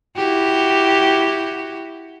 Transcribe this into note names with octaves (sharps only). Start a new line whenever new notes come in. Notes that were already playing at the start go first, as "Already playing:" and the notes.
E4 F#4 G4